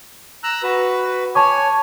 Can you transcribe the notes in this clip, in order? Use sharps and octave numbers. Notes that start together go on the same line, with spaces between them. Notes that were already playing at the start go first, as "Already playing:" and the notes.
A#5 E6 F#6
F#4 B4
C#5 G#5 A5 C#6 D6